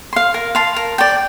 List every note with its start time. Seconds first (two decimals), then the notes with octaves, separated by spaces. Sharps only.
0.13 F5 C6
0.34 A#4
0.55 F5 A5 C6
0.76 A#4
0.98 D5 G5